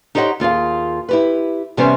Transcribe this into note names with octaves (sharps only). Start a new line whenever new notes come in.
D#4 G4 C5 C#5 D#5 F#5
D#2 F4 G#4 F5
E4 G4 B4
C3 E3 G3 B3 C#4 C5